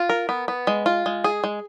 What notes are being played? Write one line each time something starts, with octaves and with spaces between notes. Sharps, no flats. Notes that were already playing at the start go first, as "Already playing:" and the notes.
Already playing: F4
A#4
B3
B3
G#3
F4
G#3
G#4
G#3